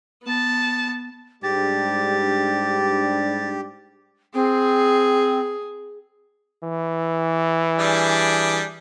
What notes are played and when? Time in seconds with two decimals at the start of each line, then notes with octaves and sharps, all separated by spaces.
0.24 B3 A5
1.43 G#2 G3 D4 G4 A6
4.34 C4 G#4
6.63 E3
7.79 G3 D4 G#4